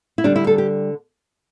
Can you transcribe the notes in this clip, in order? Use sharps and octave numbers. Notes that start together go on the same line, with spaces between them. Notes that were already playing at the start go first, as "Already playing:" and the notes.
E4
D3 G3 D4
E4
A4
G4